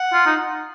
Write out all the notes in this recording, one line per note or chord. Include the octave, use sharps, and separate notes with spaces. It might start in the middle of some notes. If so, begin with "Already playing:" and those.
Already playing: F#5
F4
D#4